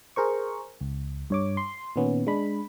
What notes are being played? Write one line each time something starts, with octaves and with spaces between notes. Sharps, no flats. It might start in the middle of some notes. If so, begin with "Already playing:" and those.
G#4 A#4 C5 C#6
C#2
G2 C#5 D6
C6
A#2 D#3 B3 C#4
G#3 D4 B5